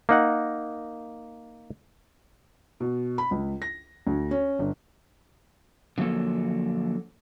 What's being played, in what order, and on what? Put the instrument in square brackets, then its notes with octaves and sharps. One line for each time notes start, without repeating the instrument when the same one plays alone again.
[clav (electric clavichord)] A#3 D#4 F#5
[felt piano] B2
B5
C#2
A#6
D2
C#4
G1
[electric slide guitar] D3 F3 F#3 A#3 A4